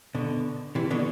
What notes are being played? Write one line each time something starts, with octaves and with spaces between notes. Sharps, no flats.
B2 D3
C3 E3
B2 D3